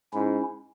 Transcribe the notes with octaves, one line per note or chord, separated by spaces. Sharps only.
G#2 C#4 E4